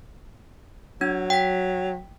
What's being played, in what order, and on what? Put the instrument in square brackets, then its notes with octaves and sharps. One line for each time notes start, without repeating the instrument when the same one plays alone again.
[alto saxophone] F#3 [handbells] D4 G#6
[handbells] G5 B6